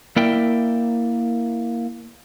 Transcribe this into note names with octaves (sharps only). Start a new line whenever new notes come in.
A#3 E4 A#4 D5 E5 G5